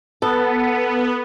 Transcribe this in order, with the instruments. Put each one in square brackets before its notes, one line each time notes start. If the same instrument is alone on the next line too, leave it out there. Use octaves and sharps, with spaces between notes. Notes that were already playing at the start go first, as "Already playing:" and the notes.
[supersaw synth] B3 [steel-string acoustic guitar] A4